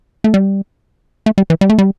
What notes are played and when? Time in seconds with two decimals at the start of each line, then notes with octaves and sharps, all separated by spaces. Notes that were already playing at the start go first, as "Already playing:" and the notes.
0.24 A3
0.34 G3
1.26 A3
1.38 G3
1.50 E3
1.61 G3
1.69 A3
1.78 G3